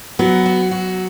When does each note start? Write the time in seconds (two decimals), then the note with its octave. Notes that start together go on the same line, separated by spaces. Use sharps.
0.19 F#3 B3
0.46 F#4
0.71 F#4